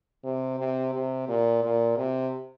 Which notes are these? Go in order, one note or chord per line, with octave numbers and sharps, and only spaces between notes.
C3
C3
C3
A#2
A#2
C3